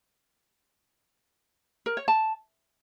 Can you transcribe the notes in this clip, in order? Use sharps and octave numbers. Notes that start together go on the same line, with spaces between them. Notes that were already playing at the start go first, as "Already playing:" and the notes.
A#4
C#5
A5